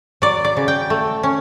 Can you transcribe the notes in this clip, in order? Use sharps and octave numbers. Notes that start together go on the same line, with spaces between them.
F#3 D5
D5
C#3
G5
A3
C#4